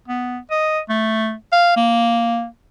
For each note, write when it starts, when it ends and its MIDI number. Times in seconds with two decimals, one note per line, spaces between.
0.08 0.38 59
0.51 0.79 75
0.90 1.33 57
1.52 1.73 77
1.76 2.46 58